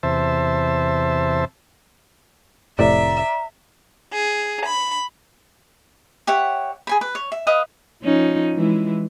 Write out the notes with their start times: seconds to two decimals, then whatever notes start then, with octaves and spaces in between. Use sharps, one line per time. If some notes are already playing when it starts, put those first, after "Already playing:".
0.03 E2 C3 C5 E5 A5
2.79 F1 A2 C3 D5 E5 A#5
4.14 G#4
4.66 B5
6.27 G4 C#5 E5 F#5
6.87 G#4 G#5 B5
7.01 B4
7.15 C#5
7.32 E5
7.47 B4 D#5 F5 D#6
8.03 F3 C#4 D#4
8.55 E3 G#3 E4